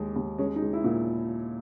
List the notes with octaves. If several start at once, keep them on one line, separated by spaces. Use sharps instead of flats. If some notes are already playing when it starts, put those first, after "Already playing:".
Already playing: D#2 G#3
D#2
G#3 C#4
D#4
G#3
E4
A#2